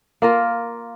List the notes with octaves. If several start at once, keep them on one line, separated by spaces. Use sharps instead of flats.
A#3 F4 A#4